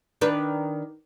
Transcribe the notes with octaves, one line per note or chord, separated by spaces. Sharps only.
D#3 D4 B4